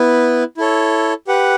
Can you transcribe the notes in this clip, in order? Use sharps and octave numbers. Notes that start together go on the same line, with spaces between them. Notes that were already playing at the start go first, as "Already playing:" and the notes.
Already playing: B3 E4 B4
E4 A4 C#5
G4 B4 F#5